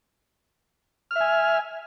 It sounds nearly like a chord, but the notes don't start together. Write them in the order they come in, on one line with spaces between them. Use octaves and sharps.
F6 E5 G#5